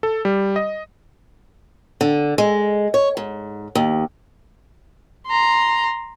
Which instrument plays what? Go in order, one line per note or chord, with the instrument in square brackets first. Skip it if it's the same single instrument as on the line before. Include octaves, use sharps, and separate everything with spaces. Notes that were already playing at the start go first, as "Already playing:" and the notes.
[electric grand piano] A4
G3
D#5
[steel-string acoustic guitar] D3
G#3
C#5
G#2
D#2
[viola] A#5 C6